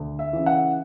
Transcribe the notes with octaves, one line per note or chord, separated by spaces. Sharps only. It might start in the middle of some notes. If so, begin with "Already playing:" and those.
Already playing: D2
E5
C#3 E3
F#5